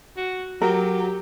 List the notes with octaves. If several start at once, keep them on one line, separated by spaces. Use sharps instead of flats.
F#4
F#3 G4 A#4